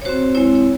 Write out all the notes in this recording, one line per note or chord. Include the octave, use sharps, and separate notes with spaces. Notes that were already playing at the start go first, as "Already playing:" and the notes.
C#5
C4 F#4 C5
G#3 C4 E4 C#5
C#5